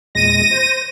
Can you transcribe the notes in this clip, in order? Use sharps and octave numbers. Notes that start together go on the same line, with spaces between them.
E2 A#2 G#3 A#6 D#7
C5